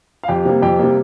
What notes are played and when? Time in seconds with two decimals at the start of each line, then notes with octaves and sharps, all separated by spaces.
0.23 F5
0.28 F2 G4 G5
0.45 C3 G3 A#3
0.62 F2 G4 G5
0.79 C3 G3 A#3